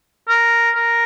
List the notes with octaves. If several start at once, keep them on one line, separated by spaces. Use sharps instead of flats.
A#4
A#4